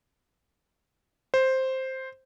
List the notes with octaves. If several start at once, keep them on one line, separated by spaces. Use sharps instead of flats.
C5